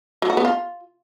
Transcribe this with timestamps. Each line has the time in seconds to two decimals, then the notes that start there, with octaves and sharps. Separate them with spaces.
0.22 F#3
0.30 F#4
0.37 B3
0.45 F4